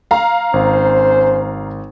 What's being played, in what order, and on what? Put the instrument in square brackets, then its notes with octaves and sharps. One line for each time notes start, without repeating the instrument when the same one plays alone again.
[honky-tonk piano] F5 A#5
[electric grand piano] G#1 [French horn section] C#4 C5